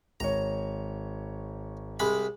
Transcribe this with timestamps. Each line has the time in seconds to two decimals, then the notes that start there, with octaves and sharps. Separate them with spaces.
0.20 G#1 C#5 A#5
2.00 C2 G#3 B5